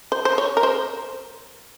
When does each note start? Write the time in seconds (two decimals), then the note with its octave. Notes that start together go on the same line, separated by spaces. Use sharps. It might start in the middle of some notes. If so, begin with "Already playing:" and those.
0.12 C5
0.25 C5
0.38 C#5
0.57 A#4
0.63 C5